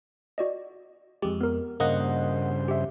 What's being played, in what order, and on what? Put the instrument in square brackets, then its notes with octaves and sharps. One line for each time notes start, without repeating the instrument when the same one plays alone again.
[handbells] F#4 D5 D#5
[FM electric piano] F2 G#3 [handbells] G4
[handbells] B3 A#4
[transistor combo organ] G2 C#3 C5 [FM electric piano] A#3 D#5 F#5
[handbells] G4 E5